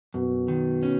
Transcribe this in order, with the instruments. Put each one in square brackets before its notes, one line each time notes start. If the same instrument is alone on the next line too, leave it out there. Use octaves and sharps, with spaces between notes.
[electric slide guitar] F#2 [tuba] B2
[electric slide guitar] D#3
C#4